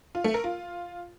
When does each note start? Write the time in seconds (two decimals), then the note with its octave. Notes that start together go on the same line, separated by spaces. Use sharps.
0.15 F4
0.24 A3
0.34 A#4
0.44 F4